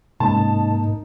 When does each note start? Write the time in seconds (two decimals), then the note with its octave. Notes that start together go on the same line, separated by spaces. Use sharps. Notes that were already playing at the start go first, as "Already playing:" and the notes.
0.20 G#2 C3 G#3 A#3 C#4 D#4 A5